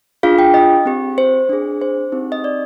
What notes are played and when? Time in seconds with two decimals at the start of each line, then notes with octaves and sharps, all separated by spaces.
0.23 D4 F4 G#4 F5
0.39 G5
0.54 D#5
0.85 C4 G4
1.18 C5
1.49 D4 G#4
1.81 C5
2.12 C4 D#4 G4
2.32 D#5
2.44 D5